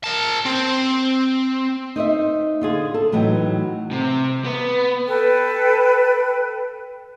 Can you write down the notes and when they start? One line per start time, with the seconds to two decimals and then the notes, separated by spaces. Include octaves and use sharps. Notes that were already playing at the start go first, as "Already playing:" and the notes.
0.04 A#4 A5
0.46 C4
1.96 D#4 C5 D#5 E5
2.61 D3 F4 G#4
2.94 A4
3.12 A2 E3 F#3 D#4 G5
3.91 C3
4.44 B3
5.07 A4 B4 G5